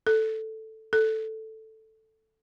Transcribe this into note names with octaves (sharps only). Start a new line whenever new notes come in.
A4
A4